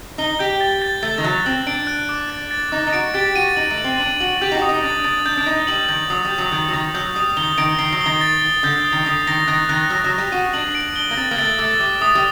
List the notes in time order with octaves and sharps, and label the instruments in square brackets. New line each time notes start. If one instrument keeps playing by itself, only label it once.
[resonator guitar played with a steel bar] D#4 [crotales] G7
[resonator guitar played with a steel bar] G4 [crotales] G6
[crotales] A6
A6
[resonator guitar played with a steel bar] A3 [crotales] A6
[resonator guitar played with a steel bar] D#3
[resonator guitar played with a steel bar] F#3 [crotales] F#6
[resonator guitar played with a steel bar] C4 [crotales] F#7
[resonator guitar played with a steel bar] D4 [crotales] D7
[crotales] F#6
D6
A6
A6
[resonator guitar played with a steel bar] D#4 [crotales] D6
[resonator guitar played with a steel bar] D#4
[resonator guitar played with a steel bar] F#4 [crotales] D7
[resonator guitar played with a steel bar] G4 [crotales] A6
[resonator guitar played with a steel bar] F#4 [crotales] D#7
[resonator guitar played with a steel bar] D#4 [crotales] F#7
[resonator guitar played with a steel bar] A3
[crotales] F#7
[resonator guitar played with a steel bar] C4
[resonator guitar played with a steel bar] D4 [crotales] F#7
[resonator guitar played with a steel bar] F#4 [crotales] F#7
[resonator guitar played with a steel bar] G4 [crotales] G6
[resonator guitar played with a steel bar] D#4
F#4
[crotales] D#6
[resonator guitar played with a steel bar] D#4
[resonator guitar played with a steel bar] D4 [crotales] A6
[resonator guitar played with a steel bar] D4 [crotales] A6
[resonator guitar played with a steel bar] D4 [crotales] G6
[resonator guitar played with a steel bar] D4
[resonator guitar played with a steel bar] D#4 [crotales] G6
[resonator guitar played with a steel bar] G3 [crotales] F#7
[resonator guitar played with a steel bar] D#3 [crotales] G6
[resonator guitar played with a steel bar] F#3 [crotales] D#6
[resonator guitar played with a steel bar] G3
[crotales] G6
[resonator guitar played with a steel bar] F#3
[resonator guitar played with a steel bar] D#3 [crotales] G6
[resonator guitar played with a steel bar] F#3
[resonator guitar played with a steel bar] D#3 [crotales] F#7
[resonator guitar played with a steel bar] F#3 [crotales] G6
[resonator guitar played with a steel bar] G3 [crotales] D#6
[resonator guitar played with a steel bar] D#3 [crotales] G7
[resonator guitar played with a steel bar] D#3 [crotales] D7
[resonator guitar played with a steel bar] D#3 [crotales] C7
[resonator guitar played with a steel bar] F#3
[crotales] G7
[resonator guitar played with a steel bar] D#3
[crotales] A6
A6
[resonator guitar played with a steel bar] D3 [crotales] G6
[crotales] D#6
[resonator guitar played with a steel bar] D#3
[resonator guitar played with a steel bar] D3 [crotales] D#6
[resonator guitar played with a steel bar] D#3 [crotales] A#6
[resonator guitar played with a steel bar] D#3 [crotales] F#6
[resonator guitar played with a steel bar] D#3 [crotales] F#6
[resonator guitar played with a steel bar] F#3 [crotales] F#6
[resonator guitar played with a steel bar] F#3
[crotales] F#6
[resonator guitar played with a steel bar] G3
[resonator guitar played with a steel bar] F#4 [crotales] D#7
[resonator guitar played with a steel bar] D4 [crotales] F#7
[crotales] D7
G7
[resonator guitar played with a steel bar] A#3
[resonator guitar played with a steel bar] C4 [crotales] A6
[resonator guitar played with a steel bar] A#3
[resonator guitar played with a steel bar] A3 [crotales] A6
[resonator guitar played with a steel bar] A3 [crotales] D6
[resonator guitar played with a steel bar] G3 [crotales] D6
[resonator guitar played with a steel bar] A3 [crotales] D#6
[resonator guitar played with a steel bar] G3